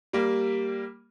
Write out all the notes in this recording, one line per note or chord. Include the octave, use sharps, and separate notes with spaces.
G3 A#3